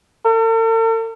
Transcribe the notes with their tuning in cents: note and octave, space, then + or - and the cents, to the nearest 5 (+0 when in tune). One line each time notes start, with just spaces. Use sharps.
A4 +45